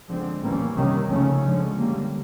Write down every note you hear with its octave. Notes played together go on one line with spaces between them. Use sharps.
D3 F3 G#3 C4
A2 E3 G3 A#3 C#4
C3 D#3 G3 A#3 C#4
C#3 F3 A3 C#4
D3 F3 G#3 C#4
D3 G3 A#3